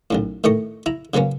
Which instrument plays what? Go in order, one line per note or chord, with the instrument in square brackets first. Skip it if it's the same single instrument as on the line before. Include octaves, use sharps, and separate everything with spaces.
[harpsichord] B1 F#2 A2
A2 D#3 A3 D#5 C#6
E4 A#5
C#3 F#3 A#3 B3 C#4